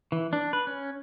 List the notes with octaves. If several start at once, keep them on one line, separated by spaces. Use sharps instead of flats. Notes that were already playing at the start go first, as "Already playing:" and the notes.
E3
D4
B4
C#4